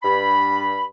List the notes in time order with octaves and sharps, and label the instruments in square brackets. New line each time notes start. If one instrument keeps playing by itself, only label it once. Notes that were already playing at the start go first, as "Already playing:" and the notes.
[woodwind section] G2 B5